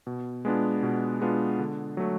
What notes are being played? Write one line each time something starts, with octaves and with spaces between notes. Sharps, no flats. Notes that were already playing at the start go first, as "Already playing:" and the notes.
B2
G#3 B3 D4 F4
B2
G#3 B3 D4 F4
D3
F#3 A3